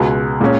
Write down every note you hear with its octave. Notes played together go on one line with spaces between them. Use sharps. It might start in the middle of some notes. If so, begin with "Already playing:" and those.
Already playing: C#2 B2 G#3
A#2 G#3 C#4